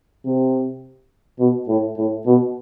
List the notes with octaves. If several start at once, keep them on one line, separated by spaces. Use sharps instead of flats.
C3
B2
A2
A2
B2